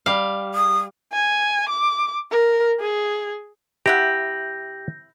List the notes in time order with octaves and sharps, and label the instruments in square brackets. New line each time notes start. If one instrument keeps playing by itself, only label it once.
[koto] G3 F5
[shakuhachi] D#6
[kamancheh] G#5
D6
A#4
G#4
[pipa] C3 E4 F#5 [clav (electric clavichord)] G4 [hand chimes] G6 A#6